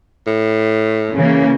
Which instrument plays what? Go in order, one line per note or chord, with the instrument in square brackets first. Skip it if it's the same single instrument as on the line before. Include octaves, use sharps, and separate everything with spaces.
[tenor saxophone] A2
[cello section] C#3 E3 A#3